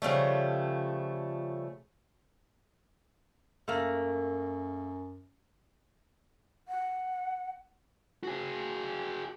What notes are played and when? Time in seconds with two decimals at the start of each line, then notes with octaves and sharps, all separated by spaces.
0.02 C#3 F3 G3 A3
3.68 F#2 A3 A#3
6.68 F#5
8.23 F#4 G#4